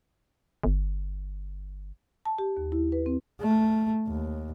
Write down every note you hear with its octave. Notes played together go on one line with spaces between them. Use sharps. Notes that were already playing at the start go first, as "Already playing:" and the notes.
G1
A5
G4
D#2
E4
B4
C4
A3
D#2